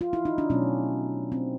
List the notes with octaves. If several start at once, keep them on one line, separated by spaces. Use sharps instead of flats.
F4
E4
D#4
D4
B2 F#3 A3 C#4
C4